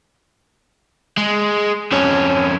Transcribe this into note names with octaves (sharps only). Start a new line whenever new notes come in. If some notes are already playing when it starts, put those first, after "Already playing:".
G#3
F2 C#4